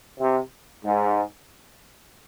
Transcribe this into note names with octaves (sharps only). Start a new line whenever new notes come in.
C3
G#2